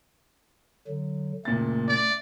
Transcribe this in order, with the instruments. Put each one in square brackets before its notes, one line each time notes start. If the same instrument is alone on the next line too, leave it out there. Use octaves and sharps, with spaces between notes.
[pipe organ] D3 F#3
[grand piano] F#1 A#2 A6 [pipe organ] A3
[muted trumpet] D5